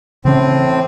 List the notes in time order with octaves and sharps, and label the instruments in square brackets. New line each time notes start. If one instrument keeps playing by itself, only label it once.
[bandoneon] A2 C4 [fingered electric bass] C#3 E3 C#4